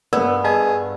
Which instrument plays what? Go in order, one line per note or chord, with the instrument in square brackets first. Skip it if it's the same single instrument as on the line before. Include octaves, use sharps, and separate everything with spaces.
[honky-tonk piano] G2 E6 [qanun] B3 [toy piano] A#4 C#5 D5
[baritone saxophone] G#4 [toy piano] D#5 F5 A5